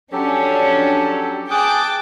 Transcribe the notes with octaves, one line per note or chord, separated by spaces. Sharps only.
F3 F#3 C#4 D4 G4 A4
G#4 G5 A5 D6 D#6 F#6